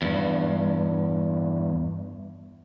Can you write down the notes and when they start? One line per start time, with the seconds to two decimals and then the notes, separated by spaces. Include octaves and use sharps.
0.02 E2 G2